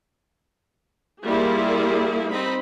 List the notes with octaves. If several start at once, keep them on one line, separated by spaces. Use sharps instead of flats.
G3 A#3 E4 F4 G#4
C4 D#4 B5